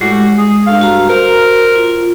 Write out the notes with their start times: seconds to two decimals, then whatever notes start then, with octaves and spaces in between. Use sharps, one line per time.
0.01 A2 G3 G#3 F#4
0.38 G#4
0.67 G2 A3 F5
0.81 F#4 A#5
1.10 A#4 C5
1.76 F4